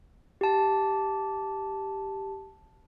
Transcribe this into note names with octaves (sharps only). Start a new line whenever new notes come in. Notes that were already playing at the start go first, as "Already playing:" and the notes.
G4 A5